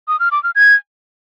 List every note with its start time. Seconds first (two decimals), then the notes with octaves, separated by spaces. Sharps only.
0.08 D#6
0.20 F6
0.32 D6
0.43 F6
0.55 G#6